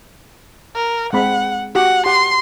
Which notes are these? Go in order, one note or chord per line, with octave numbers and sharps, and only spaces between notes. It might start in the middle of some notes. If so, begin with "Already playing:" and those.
A#4
G#3 C4 F#5 B5
F#4 G4 F#5
G4 F#5 C6